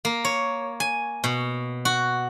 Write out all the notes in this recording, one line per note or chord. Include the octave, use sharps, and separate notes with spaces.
A#3
C#5
G#5
B2
F#4